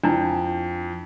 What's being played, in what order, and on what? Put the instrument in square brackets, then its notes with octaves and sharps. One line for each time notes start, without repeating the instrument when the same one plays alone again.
[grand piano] F2 [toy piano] D4 E4